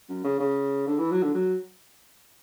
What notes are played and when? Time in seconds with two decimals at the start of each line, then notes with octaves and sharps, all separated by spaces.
0.09 F#2
0.25 C#3
0.40 C#3
0.87 D3
0.99 E3
1.11 F#3
1.23 D3
1.34 F#3